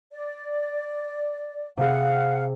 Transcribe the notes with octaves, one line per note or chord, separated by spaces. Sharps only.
D5
C3 G#4 F5 F#5